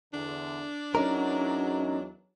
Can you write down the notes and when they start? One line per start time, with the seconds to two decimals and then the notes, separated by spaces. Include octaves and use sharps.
0.14 E2 D3 D4
0.95 E2 F#3 C#4 D#4 A#4